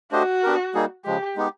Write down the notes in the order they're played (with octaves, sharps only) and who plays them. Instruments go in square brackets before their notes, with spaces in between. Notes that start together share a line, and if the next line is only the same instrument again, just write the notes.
[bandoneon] A3 D4 G4 C5 D#5 [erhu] F#4
[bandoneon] B3 D4 G4 A#4
G3 A#3 D#4 G#4
[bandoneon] C#3 F3 G#3 [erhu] G4
[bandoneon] G#3 B3 D#4 G4